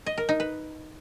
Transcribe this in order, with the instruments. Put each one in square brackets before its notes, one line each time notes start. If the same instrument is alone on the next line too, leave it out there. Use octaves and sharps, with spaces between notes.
[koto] D#5
A#4
D#4
B4